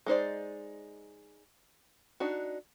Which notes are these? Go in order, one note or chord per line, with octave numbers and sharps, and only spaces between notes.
G#3 D#4 C5 D5
D4 D#4 F#4